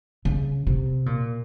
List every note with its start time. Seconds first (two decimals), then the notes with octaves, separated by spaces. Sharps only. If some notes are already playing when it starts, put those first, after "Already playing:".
0.25 C#3
0.67 C3
1.06 A#2